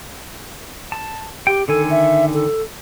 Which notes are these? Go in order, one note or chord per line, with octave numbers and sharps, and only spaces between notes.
A5
G4 G5
D3 D#3 A4 G#5
E5
A4